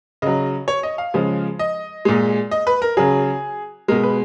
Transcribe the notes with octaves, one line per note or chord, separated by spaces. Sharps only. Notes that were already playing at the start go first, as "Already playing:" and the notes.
C#3 F#3 D#5
C#5
D#5
F5
C#3 F3 G#3
D#5
A#2 G#3
D#5
B4
A#4
C#3 F#3 G#4
B2 G#3 A#4
B4